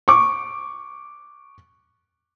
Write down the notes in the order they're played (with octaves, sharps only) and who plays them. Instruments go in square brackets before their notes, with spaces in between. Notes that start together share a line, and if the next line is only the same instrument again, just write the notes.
[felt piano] C#6 D6